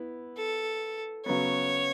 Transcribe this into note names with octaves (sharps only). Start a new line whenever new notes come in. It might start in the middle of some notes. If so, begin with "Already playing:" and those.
Already playing: B3 E4
A4
C#3 F#3 B3 C#5